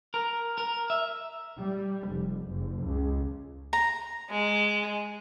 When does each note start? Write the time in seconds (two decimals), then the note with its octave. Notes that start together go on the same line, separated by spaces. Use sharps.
0.14 A#4
0.58 A#4
0.90 E5
1.58 G3
2.10 F1
2.48 F#1
2.83 C#2
3.73 A#5
4.30 G#3